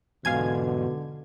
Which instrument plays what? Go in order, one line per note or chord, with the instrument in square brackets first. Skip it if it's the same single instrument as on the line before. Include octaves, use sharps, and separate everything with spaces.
[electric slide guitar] E2 G#2 [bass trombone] B2 [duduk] D3 [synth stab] F5 G#5 G#6